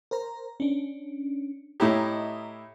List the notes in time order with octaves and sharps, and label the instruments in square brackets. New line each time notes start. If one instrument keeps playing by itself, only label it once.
[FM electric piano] A#4 C5 A#5
C#4 D4
[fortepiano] A2 E4 G4 [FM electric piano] D#5 A#5 D#6